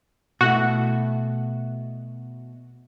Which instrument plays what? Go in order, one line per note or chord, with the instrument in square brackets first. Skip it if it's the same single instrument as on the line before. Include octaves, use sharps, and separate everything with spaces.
[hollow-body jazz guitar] B2 A3 E4 [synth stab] F#4